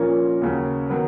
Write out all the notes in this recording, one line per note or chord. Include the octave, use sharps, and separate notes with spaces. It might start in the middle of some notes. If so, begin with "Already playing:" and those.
Already playing: A#2 F3 A#3 C#4 F4
D#2 C#3 F#3
D#3 F#3 B3